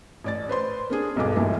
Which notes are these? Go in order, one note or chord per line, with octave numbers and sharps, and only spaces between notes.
A1 D5 A6
B4 C5 C6
A#3 D4 G#4
E1 B1 G2 A4 D6
A#1 D#2 A#2 E3 F#3 A3